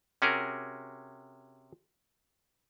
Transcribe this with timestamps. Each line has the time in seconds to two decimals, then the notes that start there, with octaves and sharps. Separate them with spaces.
0.22 C3 C#4 F#4 G#4 A#4